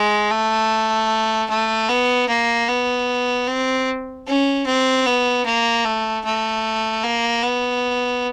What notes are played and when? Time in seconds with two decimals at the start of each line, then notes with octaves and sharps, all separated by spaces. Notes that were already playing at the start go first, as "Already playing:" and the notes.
Already playing: G#3
0.31 A3
1.50 A3
1.89 B3
2.29 A#3
2.69 B3
3.47 C4
4.27 C#4
4.67 C4
5.06 B3
5.46 A#3
5.85 A3
6.25 A3
7.04 A#3
7.43 B3